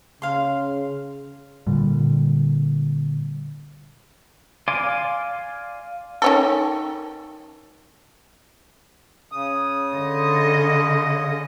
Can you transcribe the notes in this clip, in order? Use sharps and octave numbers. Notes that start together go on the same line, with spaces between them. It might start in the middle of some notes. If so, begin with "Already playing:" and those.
C#3 F5 C6
A#2 D3 G3
D5 F5 G#5 C6 D6
D#3 C#4 A4
C#3 D#6
D3 D#5